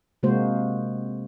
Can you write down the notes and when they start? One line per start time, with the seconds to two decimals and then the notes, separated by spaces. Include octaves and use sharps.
0.23 C3 G#3 A#3 F#4 C5